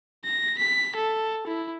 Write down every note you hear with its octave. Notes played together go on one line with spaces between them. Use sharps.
A#6
B6
A4
E4